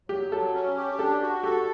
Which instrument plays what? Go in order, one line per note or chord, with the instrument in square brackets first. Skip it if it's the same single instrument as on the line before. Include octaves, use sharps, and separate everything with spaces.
[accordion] F#3 [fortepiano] G4
[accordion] F#3 [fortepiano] A4
[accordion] C#4
G4
[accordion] D4 [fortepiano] A4
[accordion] F#4
[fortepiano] G4 [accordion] A4